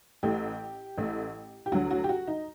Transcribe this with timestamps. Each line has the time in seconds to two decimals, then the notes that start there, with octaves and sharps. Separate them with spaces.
0.23 A1 A2 A3 G4
0.98 A1 A2 A3
1.66 G4
1.72 D2 D3 F#3 F#4
1.91 F#4
2.04 G4
2.09 F#4
2.27 D#4